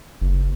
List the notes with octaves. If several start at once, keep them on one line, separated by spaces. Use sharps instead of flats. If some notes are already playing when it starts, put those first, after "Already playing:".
F#1